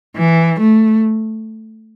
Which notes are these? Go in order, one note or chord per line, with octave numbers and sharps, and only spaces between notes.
E3
A3